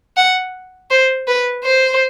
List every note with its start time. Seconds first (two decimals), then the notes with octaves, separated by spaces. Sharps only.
0.17 F#5
0.91 C5
1.28 B4
1.64 C5